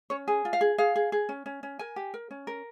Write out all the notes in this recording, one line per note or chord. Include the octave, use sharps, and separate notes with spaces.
C#4 C#5
G#4
F4
F5
G#4
G#4 F5
G#4
G#4
C#4
C#4
C#4
A#4 G#5
G4
A#4
C#4
A#4